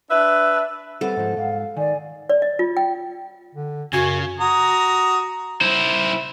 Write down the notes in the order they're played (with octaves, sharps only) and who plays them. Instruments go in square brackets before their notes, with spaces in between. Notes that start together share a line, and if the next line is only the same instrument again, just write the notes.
[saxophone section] D4 B4 E5
[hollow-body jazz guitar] G3 C4 B4 [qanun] A4 [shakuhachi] F#5
[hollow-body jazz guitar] G#2 F3 [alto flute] C5
[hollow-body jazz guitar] G#2 [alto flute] F5
[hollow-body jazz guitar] D#3 [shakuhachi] D5 [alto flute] G#5
[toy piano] D5
D#5
F4
G5
[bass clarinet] D3
[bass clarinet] F#2 [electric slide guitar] C#3 [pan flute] F#4 [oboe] G#5
[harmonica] F#4 A#5 D#6
[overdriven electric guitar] E4 C5